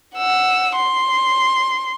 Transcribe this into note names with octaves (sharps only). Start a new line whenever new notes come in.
F#5 E6
C6